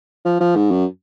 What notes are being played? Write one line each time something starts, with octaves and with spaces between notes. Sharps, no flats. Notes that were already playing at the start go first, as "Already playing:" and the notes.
F3
F3
G#2
F#2